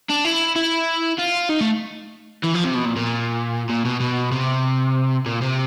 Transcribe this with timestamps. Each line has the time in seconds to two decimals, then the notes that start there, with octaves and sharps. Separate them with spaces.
0.09 D4
0.25 E4
0.56 E4
1.19 F4
1.50 D#4
1.61 A3
2.44 E3
2.54 F3
2.64 C3
2.75 B2
2.85 A#2
2.96 A#2
3.69 A#2
3.85 B2
4.00 B2
4.32 C3
5.26 A#2
5.42 C3